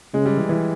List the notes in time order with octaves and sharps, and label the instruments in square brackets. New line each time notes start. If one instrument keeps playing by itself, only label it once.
[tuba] C#3 [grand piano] G#3
[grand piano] G3
E3
E3